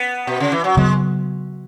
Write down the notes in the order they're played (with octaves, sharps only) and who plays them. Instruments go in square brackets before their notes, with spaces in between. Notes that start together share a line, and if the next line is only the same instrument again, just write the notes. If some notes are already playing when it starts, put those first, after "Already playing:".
Already playing: [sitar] B3
B2
C#3
E3
F#3
[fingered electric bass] C#3 F#3 B3 [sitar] G#3